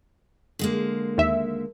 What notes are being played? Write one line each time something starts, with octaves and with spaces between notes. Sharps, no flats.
D3 G#3 A#3
D#2 E5